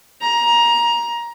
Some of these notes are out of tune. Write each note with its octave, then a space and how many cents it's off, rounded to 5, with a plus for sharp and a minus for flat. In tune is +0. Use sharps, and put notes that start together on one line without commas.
A#5 +20